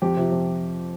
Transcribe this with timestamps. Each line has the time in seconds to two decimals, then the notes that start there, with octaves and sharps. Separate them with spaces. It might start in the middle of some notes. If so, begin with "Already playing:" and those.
0.02 F2 G4
0.17 C3 F3
0.32 F2